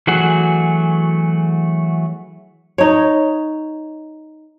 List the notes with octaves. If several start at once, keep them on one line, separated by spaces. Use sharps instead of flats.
E3 F#3 A3 F#4 G#4
D#4 C#5